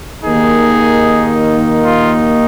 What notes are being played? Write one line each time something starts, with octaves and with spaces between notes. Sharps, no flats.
D#2 D#3 A#3 D#4 G#4
F4